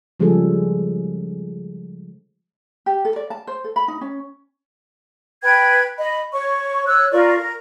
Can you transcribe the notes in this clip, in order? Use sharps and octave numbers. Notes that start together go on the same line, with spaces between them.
C#3 F3 G3 G#3 G#4 A4
G4
A4
D5
A5
C5
A4
B5
D#4
C#4
B4 G5 G#6
D#5 B5
C#5 C#6
C#5 E6 F#6
F4 A#4 D5 C#6
A#4